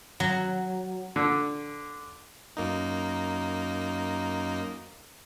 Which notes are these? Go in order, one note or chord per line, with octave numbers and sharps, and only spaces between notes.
F#3
D3
F#2 A#3 D#4